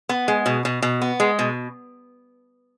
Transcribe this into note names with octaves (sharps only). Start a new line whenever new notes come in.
B3
G#3
B2
B2
B2
B3
G#3
B2